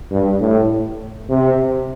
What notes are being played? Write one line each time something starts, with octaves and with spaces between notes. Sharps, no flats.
G2
A2
C3